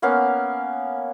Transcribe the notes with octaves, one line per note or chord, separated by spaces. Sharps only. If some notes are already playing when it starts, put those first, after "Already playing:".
A#3 B3 C#4 F5